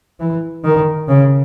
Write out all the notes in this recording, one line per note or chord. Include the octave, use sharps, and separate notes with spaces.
E3
D#3
C#3